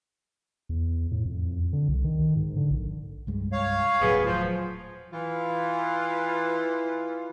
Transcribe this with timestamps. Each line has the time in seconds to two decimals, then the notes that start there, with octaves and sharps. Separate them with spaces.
0.69 E2
1.11 A2
1.25 F2
1.73 D3
1.88 C2
2.04 D#3
2.36 G#2
2.56 D3
2.70 A#1
3.27 C2 G2 G#3
3.53 C#5 F5
4.01 D#1 A2 F#3 B3 G#4
4.26 F3 F4
5.12 E3 F4